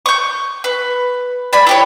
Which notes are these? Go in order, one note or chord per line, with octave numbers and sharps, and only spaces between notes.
C#6 G6
B4
D5 G#5 B5
E4 G4 C#5